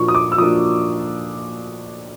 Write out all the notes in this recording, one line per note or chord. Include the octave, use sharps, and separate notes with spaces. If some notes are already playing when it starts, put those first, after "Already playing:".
Already playing: A#2 F3 A#3 D4 C#6
D#6
D6
E6
A#2 F3 A#3 D4 D#6